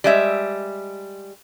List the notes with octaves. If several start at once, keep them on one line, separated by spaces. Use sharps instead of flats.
G3 G#3 E5